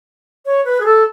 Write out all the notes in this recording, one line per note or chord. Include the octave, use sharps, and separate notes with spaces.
C#5
B4
G#4
A4